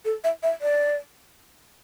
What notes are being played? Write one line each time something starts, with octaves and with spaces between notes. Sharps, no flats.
A4
E5
E5
D5